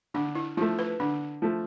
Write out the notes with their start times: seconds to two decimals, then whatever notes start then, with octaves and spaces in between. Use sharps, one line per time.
0.14 D3 D4
0.35 E4
0.57 F3 A3 E4
0.79 B4
1.00 D3 D4
1.42 F3 A3